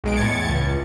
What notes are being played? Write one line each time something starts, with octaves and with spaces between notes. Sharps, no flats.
B1 G#3 D7
E2 A2 G#6 A6 C#7
C#2